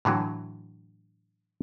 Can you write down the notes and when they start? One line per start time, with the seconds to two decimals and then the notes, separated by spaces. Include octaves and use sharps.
0.05 A2 D3 E3 F#3